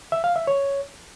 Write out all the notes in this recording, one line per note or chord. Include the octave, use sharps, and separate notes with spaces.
E5
F5
E5
C#5